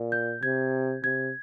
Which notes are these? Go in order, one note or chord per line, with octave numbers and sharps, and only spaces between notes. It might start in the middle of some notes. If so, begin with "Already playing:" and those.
Already playing: A#2
G6
C3 G#6
C3 G#6